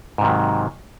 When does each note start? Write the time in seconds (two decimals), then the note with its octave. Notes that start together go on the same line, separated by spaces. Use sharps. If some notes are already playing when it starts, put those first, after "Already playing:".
0.18 G#2
0.21 C3
0.24 D#3
0.27 F#3